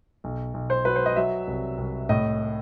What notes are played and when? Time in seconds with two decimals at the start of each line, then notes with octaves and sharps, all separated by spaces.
0.24 B1
0.54 B1
0.70 C5
0.85 F#3 B4
0.96 C5
1.06 D#5
1.16 F#3 E5
1.47 C2
1.78 C2
2.09 A2 D#5